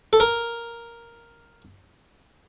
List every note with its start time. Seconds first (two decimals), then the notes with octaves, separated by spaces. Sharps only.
0.13 A4
0.20 A#4